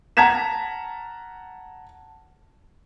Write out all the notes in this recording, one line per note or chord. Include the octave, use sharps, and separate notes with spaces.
F#5 A5 A#5 G#6 B6 E7